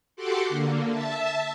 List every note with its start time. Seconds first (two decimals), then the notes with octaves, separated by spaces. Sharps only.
0.16 F#4 G4 A4 F#5 C6 D6
0.49 D3 A#3
0.90 E5 A5